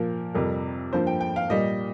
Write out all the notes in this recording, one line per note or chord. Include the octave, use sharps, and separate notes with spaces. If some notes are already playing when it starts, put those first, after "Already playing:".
Already playing: A#2 F3 A#3 A#4
F2 C3 G3 A#4
G2 F3 A#3 C5
G5
G5
F5
A#2 G3 A#3 D#5